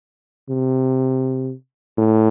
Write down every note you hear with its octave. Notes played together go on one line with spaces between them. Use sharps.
C3
A2